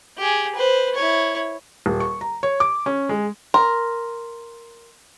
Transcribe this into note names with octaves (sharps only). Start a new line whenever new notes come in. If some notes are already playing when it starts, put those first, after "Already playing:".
G4 G#4
B4 C5
E4 C#5
D#1
C#6
A#5
C#5
D6
C#4
G#3
A#4 C6